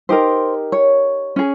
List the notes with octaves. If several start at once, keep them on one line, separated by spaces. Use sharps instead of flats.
D#4 G4 A#4 C5
C#5
C#4 G#4